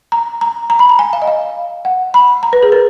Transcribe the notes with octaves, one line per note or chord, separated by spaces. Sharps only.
A#5
A#5
A#5
B5
A#5
G#5
F5
D#5
F5
F#5
B5
A#5
B4
G#4
A#4